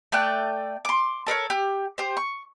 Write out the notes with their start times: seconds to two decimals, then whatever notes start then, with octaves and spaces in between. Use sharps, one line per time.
0.12 A3 D5 G5 F#6
0.85 C6 D6
1.26 A4 A#4 C5 C#5
1.50 G4
1.98 G4 C5
2.17 C#6